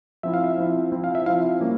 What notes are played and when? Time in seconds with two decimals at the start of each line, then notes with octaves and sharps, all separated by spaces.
0.23 F3 C4 E4 E5
0.34 F5
0.44 E5
0.58 F3 C4 E4
0.92 F3 C4 E4
1.04 F5
1.15 E5
1.26 F3 C4 E4 F5
1.61 G3 A#3 C#4